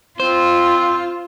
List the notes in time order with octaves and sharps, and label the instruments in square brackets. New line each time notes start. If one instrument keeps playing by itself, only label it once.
[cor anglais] C4 [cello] F4 [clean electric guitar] C5